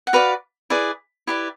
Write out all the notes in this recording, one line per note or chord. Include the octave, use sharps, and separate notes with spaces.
F#5
F#4 B4 D5 F5
E4 G#4 B4 D5
E4 G4 B4 D5